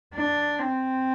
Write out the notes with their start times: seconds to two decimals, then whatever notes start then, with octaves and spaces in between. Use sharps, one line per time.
0.14 D4
0.59 C4